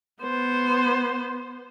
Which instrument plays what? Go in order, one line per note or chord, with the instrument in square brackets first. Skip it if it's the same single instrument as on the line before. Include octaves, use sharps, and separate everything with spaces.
[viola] B3 C5